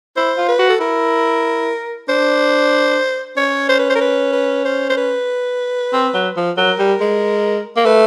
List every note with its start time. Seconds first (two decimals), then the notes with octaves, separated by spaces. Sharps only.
0.17 E4 C5
0.37 F4
0.49 B4
0.59 F#4
0.69 A4
0.80 E4 A#4
2.09 D4 C5
3.37 C#4 C#5
3.69 C5
3.79 B4
3.90 C5
3.95 A#4
4.01 B4
4.33 B4
4.65 C5
4.90 C5
4.97 B4
5.93 C4
6.14 F#3
6.37 F3
6.57 F#3 A#4
6.79 G3
7.01 G#3
7.77 A#3
7.85 A3 B4